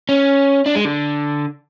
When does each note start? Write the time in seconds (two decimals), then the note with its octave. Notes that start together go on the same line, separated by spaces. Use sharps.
0.09 C#4
0.66 D4
0.75 G#3
0.85 D3